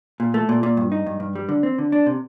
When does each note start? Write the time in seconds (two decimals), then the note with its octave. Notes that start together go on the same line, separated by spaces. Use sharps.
0.20 A#2
0.34 A3
0.49 A#2
0.63 A#2
0.77 G2
0.92 D#4
1.06 G2
1.20 G2
1.35 G3
1.49 D3
1.63 C4
1.78 D3
1.92 D4
2.06 C3